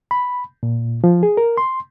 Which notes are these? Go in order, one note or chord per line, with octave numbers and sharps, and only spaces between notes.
B5
A#2
F3
G#4
A#4
C6